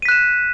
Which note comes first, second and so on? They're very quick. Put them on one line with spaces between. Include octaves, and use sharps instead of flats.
D#7 B6 F#6 E7